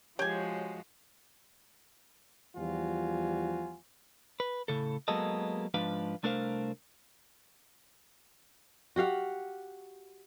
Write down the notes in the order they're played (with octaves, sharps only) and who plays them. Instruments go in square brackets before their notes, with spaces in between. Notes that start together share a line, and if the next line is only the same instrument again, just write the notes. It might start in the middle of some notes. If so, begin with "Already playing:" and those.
[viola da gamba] F3 G#3 F#4 [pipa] G4 G#5 [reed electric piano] C#5 G6
[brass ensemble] E2 F3 G3 F4 F#4 G#5
[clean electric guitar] B4
A2 C#3 A4
F#3 G#3 A#3 B3 A4 D#5
G#2 F3 D4 B4 F5
C2 A3 D4 A#4 C5 F5
[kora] F#4 G4 F5 F#5